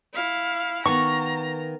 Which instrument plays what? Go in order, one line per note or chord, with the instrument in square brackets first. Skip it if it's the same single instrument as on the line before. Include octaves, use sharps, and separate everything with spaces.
[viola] E4 F5
[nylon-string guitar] D#3 A#3 B3 [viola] A#5 [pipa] C#6